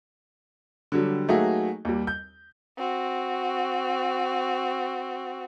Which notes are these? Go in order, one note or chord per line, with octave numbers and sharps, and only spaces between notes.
D3 F#3 G3
F#3 A3 A#3 D#4 F#4 G#4
D#2 G3
G6
C4 F#4